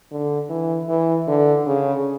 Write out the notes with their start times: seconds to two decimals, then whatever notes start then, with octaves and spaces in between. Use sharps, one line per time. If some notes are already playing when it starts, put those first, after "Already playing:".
0.12 D3
0.50 E3
0.89 E3
1.27 D3
1.66 C#3